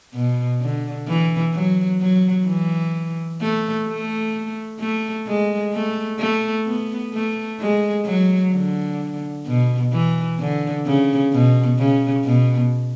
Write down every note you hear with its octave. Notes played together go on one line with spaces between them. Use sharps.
B2
D3
E3
F#3
F#3
E3
A3
A3
A3
G#3
A3
A3
B3
A3
G#3
F#3
D3
B2
E3
D3
C#3
B2
C#3
B2